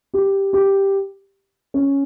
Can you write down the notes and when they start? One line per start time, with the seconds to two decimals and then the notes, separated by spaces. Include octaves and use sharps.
0.14 G4
0.53 G4
1.74 C#4